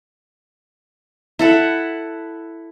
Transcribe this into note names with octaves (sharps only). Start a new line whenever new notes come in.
E4 A4 F#5